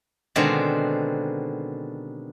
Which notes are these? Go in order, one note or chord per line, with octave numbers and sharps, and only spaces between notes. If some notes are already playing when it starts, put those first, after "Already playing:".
B2 D3 D#3 G#3 C4